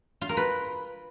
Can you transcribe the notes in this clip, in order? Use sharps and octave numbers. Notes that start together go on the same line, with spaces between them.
F4
A#4
B4